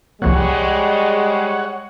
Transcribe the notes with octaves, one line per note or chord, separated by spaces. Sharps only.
C2 F2 A#2 G3 G#3 C#5 F#5